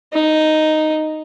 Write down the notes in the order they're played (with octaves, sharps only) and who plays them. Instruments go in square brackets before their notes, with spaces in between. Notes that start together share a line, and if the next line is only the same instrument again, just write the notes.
[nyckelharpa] D#4